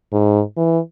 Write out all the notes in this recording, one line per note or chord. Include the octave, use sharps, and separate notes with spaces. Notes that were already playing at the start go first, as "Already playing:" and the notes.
G#2
E3